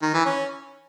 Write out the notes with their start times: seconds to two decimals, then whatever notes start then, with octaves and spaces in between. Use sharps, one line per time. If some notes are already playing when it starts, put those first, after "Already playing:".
0.02 D#3
0.14 E3
0.25 C#4